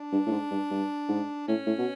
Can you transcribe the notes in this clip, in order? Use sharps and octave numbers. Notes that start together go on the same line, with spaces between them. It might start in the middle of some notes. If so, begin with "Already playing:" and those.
Already playing: D4
G2
A2
G#2
G2
G2
G#2
A2 C#4
A2
B2